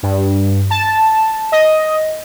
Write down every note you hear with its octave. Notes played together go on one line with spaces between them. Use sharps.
G2
A5
D#5